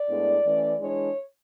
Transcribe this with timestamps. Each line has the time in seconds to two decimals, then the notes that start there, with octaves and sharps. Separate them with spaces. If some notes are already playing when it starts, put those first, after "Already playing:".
Already playing: D5
0.08 A2 G#3 B3 D4
0.45 E3 A3 C#4
0.80 E3 G#3 D4 C#5